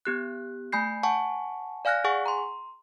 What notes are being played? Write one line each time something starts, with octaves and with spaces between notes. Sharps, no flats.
B3 G4 F#6
A3 G#5 B5 G6 C7
F#5 G#5 A5 C#6
D5 F5 G#5 F6 F#6 A#6
G#4 F#5 G#5 C#6
A#5 C6